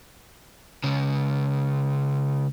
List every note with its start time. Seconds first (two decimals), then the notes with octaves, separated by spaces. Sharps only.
0.84 C#2 C#3